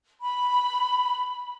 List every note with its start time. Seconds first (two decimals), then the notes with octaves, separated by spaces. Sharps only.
0.20 B5